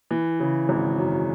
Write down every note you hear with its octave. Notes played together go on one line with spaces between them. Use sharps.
E3
C#3
G#1
F#2